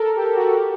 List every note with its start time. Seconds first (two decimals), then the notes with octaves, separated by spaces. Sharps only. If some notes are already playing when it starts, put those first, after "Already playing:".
Already playing: A4 A#4
0.16 G4
0.35 F#4
0.55 G4